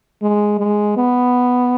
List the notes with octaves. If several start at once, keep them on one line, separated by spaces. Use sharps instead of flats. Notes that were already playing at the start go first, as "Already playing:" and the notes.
G#3
G#3
B3